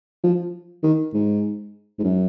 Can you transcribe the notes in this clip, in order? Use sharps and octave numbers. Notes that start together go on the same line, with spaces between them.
F3
D#3
G#2
G#2
F#2